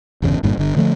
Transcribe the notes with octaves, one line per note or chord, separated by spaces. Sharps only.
G1 E2 C#3
G1 G2 A#2
G1 D3
D3 F3 A3